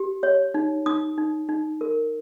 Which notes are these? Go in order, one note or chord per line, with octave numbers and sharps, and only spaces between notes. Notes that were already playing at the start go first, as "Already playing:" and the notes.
Already playing: G4
C#5
D#4
D#4 D#6
D#4
D#4
A#4